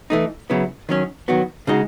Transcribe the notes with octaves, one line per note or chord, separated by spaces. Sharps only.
E3 A3 D#4
C#3 F#3 B3 E4
D#3 F#3 C#4
D#3 F#3 B3 F#4
C#3 G#3 D#4 F#4